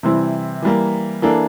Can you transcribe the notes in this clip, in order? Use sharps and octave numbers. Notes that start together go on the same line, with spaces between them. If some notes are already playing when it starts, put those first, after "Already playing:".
C3 E3 G3 C4 E4
E3 G3 A#3
E3 A#3 D4 A4